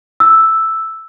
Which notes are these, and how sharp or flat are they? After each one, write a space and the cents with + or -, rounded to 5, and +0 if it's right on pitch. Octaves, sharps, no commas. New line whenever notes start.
E6 +0